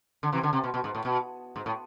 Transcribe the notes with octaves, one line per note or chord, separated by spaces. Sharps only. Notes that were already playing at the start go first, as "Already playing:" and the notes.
D3
C3 E3
D3
C3
B2
B2
G#2
A2
B2
G#2
A2